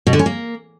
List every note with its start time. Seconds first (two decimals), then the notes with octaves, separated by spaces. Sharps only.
0.07 B2
0.13 D3
0.19 C#4
0.26 A#3